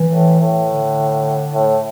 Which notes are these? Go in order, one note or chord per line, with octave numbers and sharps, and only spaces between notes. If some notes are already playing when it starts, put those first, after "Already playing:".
Already playing: E3
A2
A2
D3
A2